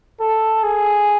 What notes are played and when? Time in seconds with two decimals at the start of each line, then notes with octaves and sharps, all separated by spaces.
0.20 A4
0.63 G#4